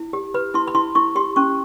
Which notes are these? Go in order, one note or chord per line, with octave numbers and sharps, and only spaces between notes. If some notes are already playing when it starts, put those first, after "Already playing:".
Already playing: E4
G4
B4 B5
E4 C6
B5
E4 C6
E4 C#6
G4 C6
C#4 C#6